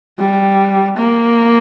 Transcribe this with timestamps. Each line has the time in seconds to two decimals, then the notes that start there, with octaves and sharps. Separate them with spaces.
0.19 G3
0.96 A#3